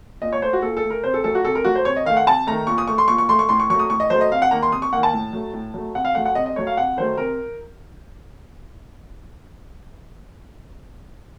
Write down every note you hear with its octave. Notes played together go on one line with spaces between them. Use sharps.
A#2 D#5
C#5
A3 C5
F#4
A#2 A4
A4
A3
A#4
C3 C5
A4
F#3 A3 A4
F#4
C3 A4
A#4
F#3 A3 F#4
C5
C3 C#5
D#5
D#3 A3 F5
F#5
C3 A5
D#3 A3 A#5
A#2 C#6
D#6
A3 C#6
C6
A#2 C#6
C#6
A3 C6
C#6
A2 C6
C#6
F#3 A3 C#6
D#6
A2 C#6
D#5
F#3 A3 C5
D#5
C3 F5
F#5
D#3 A#3 A#5
C6
C3 D#6
C#6
D#3 A#3 F#5
A5
A2
F#3 A3
A2
F#3 A3
C3 F#5
F5
F#3 A3 F#5
F#5
C3 D#5
D#5
F#3 A3 C#5
F5
C3 F#5
D#3 F#3 A3 C5
C3 A#4